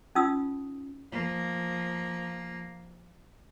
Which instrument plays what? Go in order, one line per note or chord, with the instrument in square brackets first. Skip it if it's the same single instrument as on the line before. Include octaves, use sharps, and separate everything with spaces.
[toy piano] C#4 D#4 F4 D#6 E6
[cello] F3 A#3